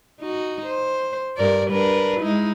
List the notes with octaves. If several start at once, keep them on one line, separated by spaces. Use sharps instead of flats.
D#4 F#4
C5
G2 A#4 D5
D4 A#4 B4
G#3 D#4 E4